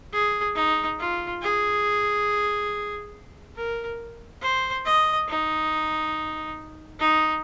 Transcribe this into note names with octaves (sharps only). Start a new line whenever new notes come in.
G#4
D#4
F4
G#4
A#4
C5
D#5
D#4
D#4